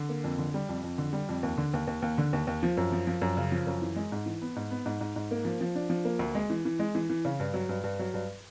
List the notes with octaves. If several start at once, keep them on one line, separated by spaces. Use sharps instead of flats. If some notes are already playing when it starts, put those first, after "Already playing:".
Already playing: D3
A#3
F2
D3
G3
F2
F2
D3
G3
F2
D#2
D3
D#2
D#2
D#2
D3
D#2
D#2
F3
F#2
F3
F3
F#2
C#3
F3
F#2
E3
G#3
G#2
E3
B3
G#2
B3
G#2
G#2
G#2
A#3
F3
F3
D4
F3
A#3
D2
G#3
E3
E3
G#3
E3
E3
C#3
G2
F#3
G2
G2
F#3
G2